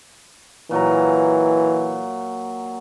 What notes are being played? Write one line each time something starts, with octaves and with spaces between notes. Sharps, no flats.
A#2 E3 F#3 A#5